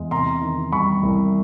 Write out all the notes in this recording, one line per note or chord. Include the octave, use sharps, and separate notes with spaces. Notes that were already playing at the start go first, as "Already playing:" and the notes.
Already playing: E2 G#3
C3 A#5 C6
D#3
G3 B5 C#6
C2